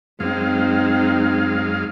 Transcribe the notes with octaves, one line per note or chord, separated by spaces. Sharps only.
F#2 G#3 C4 D#4 F5